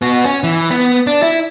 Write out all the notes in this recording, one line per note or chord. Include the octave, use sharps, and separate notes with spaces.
B3 F#4
C#4
E3
B3
D4
E4